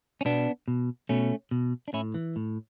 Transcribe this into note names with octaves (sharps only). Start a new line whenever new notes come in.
C#4
B2 B3 D4
B2
B2 A3 C#4
B2
D4
A2 C#4 E4
E3
A2